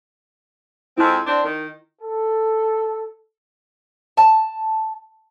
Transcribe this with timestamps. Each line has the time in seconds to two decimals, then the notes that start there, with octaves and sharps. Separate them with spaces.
0.98 F2 G#3 C4 E4
1.27 C4 D4
1.44 D#3
2.01 A4
4.17 A5